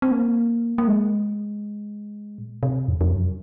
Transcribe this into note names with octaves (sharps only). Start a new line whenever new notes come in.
C4
A#3
A#3
G#3
A#2
C3
F2
F2
F#2